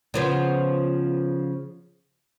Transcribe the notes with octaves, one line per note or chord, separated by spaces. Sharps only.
C#3 F3 B3